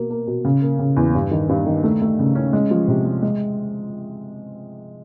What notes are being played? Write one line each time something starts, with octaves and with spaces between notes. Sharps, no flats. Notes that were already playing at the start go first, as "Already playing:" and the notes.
Already playing: B2 A#3
A#3
B2
C#3
A#3
C#3
E2
G2
D#3
G2
D#3
A3
A3
C#3
C#4
G#3
F3
C3
G#3
G#3